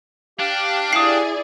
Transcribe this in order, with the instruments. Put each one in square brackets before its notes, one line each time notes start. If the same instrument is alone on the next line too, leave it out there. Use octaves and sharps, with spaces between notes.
[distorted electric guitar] D4 [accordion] G4 F5 F#6
[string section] E4 G#4 D5 [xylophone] D#6 C7